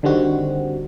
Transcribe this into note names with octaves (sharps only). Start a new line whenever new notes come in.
D3 D#3 G3 C4 F#4